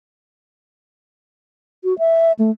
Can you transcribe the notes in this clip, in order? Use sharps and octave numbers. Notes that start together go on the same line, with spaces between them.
F#4
E5
A3